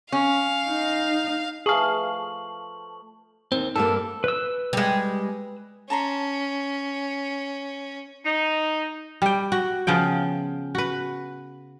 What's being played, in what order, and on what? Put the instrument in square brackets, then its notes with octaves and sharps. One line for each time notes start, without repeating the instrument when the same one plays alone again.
[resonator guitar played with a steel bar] C#4 [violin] F5
[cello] D#4
[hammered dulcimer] F3 A3 B4 [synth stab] G#4 F5 [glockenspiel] A5 C#6 F#7
[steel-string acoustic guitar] D#2 [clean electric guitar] C4
[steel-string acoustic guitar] G2 G3 A#3 [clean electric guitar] A4
[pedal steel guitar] B4 E6
[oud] G3 G#3
[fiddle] C#4 [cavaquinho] A5 A#5 C6
[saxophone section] D#4
[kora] G3 G5
F#4
C#3 F3 B3 G5
F#4 B4